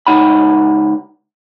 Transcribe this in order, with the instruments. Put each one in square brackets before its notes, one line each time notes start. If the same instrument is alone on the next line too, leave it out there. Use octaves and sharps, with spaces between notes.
[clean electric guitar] C#2 D#4 F#5 B5